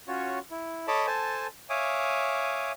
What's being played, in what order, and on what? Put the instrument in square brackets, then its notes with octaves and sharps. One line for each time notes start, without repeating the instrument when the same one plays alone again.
[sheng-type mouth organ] C#4 F4 F#4 C#5
E4
A4 C#5 D#5 A5 B5 D6
A4 C5 G#5 A5
C#5 E5 F5 G#5 D6 D#6